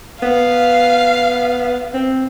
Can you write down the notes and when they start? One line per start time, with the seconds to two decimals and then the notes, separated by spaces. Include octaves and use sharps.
0.22 B3 F5
1.94 C4